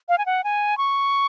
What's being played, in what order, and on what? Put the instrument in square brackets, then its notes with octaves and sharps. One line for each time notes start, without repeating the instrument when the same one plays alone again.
[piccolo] F5
G#5
F#5
G#5
C#6